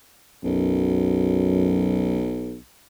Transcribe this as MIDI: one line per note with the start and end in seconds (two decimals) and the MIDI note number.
0.44 2.56 35
0.44 2.25 42